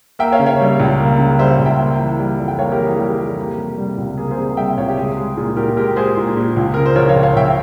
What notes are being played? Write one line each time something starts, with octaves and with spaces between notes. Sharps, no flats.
A#3 E5 G5
C#5 F5
C#3
C#5 F5
G3
C#2
A#3
C#3
G3 C5 E5
C#2
E5 G5
A#3
E3
G3
F2
G5
A#3 C#5 F5
G4 A#4
E3
G#4
G3 G4
F2 G4
A#3
C3
G3
C#2
A#3 G#4
G#4 C5
C3
G3 E5 G5
C#2 C#5 F5
G4
G#3 G#4
G#3
A#2 G#4
A#2 G4 A#4
G#3 G4 A#4
G#3 G#4 C5
A#2
A#2
C#2
C#3 A#4
C5
F3 A#4 C#5
C#5 F5
C#2
C#5 F5
C#2 E5 G5